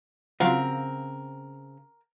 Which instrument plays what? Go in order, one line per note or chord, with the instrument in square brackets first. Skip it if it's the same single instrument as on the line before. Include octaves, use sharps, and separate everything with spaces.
[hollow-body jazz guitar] C#3 C4 [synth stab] F3 F#3 F4 [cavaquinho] A#4 [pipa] F5 F#5